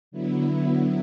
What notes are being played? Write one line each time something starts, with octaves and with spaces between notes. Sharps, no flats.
D3 F#3 B3 E4